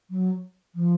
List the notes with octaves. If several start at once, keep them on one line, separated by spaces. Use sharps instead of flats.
F#3
F3